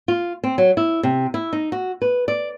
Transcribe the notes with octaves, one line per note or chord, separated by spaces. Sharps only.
F4
C4
F#3
E4
C3
E4
D#4
F#4
B4
D5